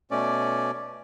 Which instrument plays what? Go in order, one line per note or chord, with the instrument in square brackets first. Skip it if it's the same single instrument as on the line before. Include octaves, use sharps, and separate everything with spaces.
[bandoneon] B2 A3 C#4 D5